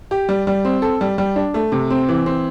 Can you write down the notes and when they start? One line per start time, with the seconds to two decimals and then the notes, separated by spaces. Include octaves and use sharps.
0.11 G4
0.29 G3
0.47 G3
0.65 C4
0.82 A4
1.01 G3
1.18 G3
1.36 D4
1.54 A3
1.72 C3
1.90 C4
2.09 E3
2.26 C4